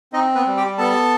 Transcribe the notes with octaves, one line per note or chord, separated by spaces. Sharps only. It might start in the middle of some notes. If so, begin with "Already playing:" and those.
C4 D#4 D#5
B3 B4
G3
G4 G5
B3 A4 A5